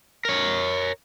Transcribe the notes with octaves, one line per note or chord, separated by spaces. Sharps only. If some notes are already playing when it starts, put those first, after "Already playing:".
A#4 C#5